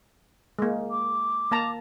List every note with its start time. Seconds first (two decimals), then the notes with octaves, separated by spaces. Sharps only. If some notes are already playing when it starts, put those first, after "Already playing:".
0.59 G#3 A#3
0.91 D6
1.51 A#3 A5 A#5